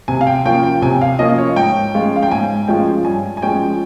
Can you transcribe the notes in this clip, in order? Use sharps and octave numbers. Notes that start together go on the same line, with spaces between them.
C3 G#5
F5
G5
F3 A#3 C#4 F4 G5
G5
C3 G#5
F5
F3 A#3 C#4 F4 D#5
C#5
G#2 G5
F3 G#3 C#4 F4
F5
G5
G#2 G#5
F3 G#3 C#4 F4 G5
G2 G#5
G#5
F3 G#3 C#4 G5